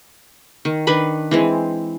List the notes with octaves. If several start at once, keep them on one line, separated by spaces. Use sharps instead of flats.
D#3
D#3 D4 B4 B5
E3 G#3 C4